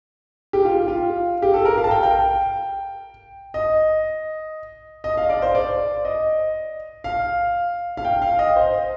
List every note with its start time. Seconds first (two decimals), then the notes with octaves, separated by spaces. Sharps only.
0.53 G4
0.65 F4
0.88 F4
1.42 G4
1.54 A4
1.65 A#4
1.78 F5
1.84 A5
1.91 G5
2.03 G5
3.54 D#5
5.04 D#5
5.17 F5
5.29 D5
5.42 C5
5.55 D5
6.05 D#5
7.04 F5
7.97 F5
8.05 G5
8.22 F5
8.39 D#5
8.56 C5